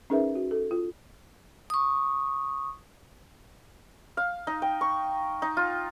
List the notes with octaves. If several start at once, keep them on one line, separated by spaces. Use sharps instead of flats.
C#4 D#4 G#4 A#4 B4 E5
F#4
A4
F4
C#6 D#6
F5
D#4
G5
C#6
D#4
F4